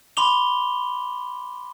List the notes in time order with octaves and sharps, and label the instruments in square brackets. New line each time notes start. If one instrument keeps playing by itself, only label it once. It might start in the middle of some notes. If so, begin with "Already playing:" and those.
[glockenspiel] B5 C6 D6 F7 G7